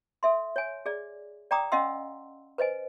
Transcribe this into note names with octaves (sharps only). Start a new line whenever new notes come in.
A4 E5 C6
C#5 G#5
G#4 D5
D5 G5 A#5 D6 D#6
C#4 D#5 F5 F#5 C6 E6
B4 C5 D#5 G#5